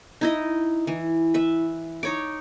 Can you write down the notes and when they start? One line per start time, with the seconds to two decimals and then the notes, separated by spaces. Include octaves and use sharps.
0.21 D#4 E4 D#5
0.87 E3
1.34 B4 E5
2.03 D#4 C#5 D6